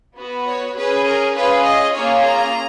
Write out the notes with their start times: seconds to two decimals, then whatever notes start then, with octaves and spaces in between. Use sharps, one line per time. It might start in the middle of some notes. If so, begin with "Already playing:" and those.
0.16 B3 F#4
0.46 C#5
0.76 C#4 G#4 B4
1.05 A#4
1.35 C#4 F4 G#4 B4
1.64 D#5
1.93 A#3 C#4 F4 G#4 C#5
2.24 A#5